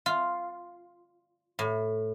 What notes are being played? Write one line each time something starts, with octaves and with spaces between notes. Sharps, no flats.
F4
A2